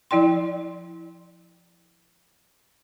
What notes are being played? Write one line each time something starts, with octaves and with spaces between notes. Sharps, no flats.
F3 E4 D5 G5 C6